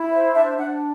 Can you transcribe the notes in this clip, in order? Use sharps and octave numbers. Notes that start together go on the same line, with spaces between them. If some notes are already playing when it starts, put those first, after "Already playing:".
Already playing: E4
C5 E5
D4 E5
D4 F#5